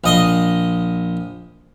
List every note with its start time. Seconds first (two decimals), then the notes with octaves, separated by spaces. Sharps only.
0.04 A#1 D#5 C6